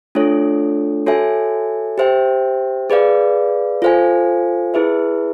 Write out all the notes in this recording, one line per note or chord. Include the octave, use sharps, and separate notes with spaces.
A3 D4 F4 A4 C#5
F#4 A4 C#5 E5 G#5
G4 C5 E5 G5
G#4 B4 D5 F5
F4 A4 C5 F5 G#5
E4 G#4 B4 E5